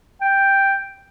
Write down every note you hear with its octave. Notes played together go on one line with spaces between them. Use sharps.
G5